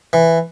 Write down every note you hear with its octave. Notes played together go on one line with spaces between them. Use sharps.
E3